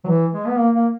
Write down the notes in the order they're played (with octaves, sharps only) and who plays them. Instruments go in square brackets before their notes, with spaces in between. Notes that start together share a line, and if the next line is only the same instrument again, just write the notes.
[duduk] F#3
E3
G#3
B3
A#3
A#3